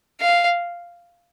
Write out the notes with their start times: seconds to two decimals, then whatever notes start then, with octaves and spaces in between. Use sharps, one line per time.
0.21 F5